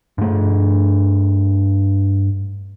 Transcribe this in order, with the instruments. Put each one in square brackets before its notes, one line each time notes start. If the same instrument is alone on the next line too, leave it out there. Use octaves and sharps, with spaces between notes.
[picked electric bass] G2 A3